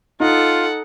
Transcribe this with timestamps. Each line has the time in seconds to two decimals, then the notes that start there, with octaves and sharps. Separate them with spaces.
0.20 D#4 F4 A4 F#5